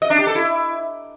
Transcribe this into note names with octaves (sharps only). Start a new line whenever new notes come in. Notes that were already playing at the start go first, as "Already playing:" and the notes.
D#5
D4
G4
A4
E4